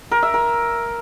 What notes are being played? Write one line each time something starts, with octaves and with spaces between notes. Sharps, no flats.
A#4
E5
A#4